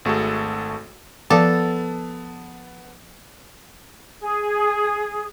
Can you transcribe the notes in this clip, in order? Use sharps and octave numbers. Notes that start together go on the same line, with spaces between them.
G#1 A3 F#4 G#4 A4
F3 B3 A4 F5 A5 D6
G#4